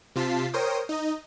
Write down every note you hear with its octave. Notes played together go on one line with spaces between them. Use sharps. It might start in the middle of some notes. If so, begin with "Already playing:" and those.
C3 F4 A5 B6 C7
A#4 C5 C#5 G5 D#6
D#4 D#5